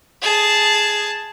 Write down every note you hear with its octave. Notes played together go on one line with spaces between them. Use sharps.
G#4 A5